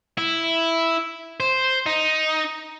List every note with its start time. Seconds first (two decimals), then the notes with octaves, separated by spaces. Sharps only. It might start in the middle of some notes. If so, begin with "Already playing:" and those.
0.18 E4
1.40 C5
1.86 D#4